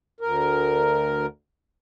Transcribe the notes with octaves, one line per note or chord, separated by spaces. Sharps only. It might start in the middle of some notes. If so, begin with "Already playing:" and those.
D2 A#4